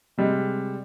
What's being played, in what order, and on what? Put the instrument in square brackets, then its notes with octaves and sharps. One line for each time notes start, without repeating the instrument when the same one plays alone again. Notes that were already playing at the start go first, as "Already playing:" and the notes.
[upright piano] C3 G3 G#3